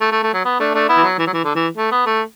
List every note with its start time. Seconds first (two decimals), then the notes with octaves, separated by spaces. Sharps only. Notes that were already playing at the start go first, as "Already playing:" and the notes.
0.01 A3
0.12 A3
0.23 A3
0.34 F#3
0.45 B3
0.60 A3 D4
0.74 A3 D4
0.89 B3 E4
0.97 E3
1.03 F#3
1.18 E3
1.27 F#3
1.33 E3
1.44 D3
1.55 E3
1.77 A3
1.91 B3
2.06 A3